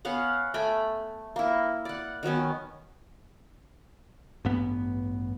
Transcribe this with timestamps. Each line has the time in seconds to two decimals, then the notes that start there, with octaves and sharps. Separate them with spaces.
0.05 B3 C#4 F5 F#5
0.54 A3 G5 G#5 B5
1.36 A#3 E4
1.85 D5 F#5
2.23 D#3 F#3 B3 C#4
4.45 A1 G2 B3